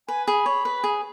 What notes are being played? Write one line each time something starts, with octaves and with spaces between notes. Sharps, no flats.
B4 G#5
G#4 B5
C#5
B4
G#4